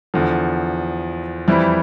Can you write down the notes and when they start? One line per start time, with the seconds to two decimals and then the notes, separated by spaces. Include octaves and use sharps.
0.14 E2 D3 F3
1.48 F2 E3 G3 C4 E4